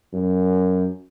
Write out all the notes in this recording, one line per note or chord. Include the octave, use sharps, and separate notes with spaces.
F#2